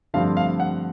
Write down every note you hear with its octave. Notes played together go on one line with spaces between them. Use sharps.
G2 D3 F3 A3 C4 F5
F5
F#5